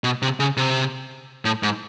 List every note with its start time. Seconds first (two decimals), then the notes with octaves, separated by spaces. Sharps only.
0.04 B2
0.22 C3
0.40 C#3
0.57 C3
1.45 A2
1.63 G#2